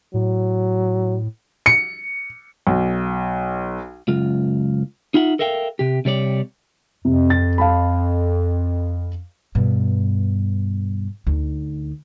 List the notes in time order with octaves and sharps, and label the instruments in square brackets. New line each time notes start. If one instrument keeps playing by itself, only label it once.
[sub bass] A2 [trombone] F#3
[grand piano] C#7
[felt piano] B1
[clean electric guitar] C#2 F#2 F4
D#4 F4 E5 F#5
A4 A#4 E5 F5 G5
C3 G4
C3 G3 C#5 D5
[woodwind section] F2 [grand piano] C3
[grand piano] A6
F5 A5 B5
[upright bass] G2 B2
D2 D#4